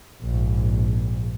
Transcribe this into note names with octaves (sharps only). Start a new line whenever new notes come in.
A#1 G#2